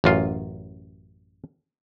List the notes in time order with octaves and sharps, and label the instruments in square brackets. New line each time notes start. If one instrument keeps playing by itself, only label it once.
[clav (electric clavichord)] A1 F#2 F4